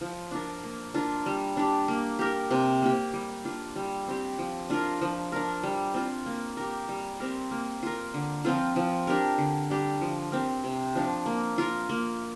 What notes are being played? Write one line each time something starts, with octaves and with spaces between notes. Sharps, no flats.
F3
D4 F4 A#4
A#3
D4 F4 A#4
G3
D4 G4
A#3
G4 A#4
C3
A#3 G4
G3
D4 F4
G3
C4 G4
F3
D4 F4 A#4
F3
D4 A#4
G3
C4 F4
A#3
G4 A#4
G3
C4 G4 A#4
A#3
F4 A#4
D3
F3 C4 F4
F3
D4 G4 A#4
D3
G3 D4 G4
F3
C4 G4 A#4
C3
F3 D4
A#3
F4 A#4
A#3